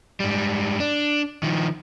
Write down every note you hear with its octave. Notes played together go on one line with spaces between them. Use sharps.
G#2 G3
D4
D#3 F3